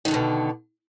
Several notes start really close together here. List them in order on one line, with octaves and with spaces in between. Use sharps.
D#3 F#3 D3 B2